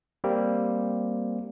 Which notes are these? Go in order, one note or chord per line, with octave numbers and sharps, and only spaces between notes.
G3 A#3 C4